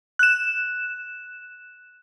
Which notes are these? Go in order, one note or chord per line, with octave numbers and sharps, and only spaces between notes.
F#6 E7